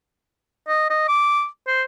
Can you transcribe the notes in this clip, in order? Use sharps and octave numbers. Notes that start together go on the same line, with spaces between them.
D#5
D#5
D6
C5